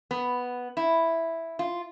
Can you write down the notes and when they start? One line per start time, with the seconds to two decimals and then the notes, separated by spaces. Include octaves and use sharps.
0.11 B3
0.77 E4
1.59 F4